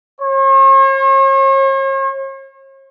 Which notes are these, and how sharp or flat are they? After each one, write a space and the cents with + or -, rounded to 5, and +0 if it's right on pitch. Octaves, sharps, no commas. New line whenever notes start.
C#5 -45